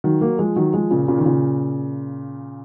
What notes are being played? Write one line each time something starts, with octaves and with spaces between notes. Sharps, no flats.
D#3 F#3
F#3 A#3
F3 G#3
D#3 F#3
F3 G#3
A#2 C#3
A#2 C#3
D#3
A#2 C#3